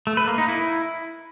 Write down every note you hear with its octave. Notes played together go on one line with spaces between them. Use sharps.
A3
B4
A#3
D#4
E4